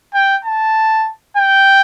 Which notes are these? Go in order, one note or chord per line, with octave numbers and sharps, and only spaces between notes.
G5
A5
G5